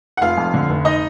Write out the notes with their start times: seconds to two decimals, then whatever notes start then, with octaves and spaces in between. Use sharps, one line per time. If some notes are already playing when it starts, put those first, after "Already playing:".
0.17 F#5
0.21 F1 F4 F5
0.37 F2
0.54 D3
0.69 F1
0.85 D#4 D#5